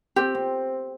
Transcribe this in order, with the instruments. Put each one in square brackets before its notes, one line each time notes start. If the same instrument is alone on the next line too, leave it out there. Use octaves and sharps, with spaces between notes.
[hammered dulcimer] C4 [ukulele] G4
[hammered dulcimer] C4